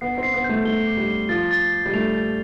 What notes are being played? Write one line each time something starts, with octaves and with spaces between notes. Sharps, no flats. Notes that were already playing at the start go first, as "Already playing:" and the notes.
B3 C7
C4
C7
B3
A3 G6
A3 G7
D6
G3
G7
F3 A6
A6
A6
G3
A3 F7
A6